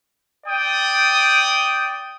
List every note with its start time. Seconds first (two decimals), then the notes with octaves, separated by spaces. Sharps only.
0.47 D5 G5 D#6